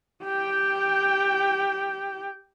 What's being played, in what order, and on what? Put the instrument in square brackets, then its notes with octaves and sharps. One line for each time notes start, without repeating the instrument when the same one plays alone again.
[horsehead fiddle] G4 G5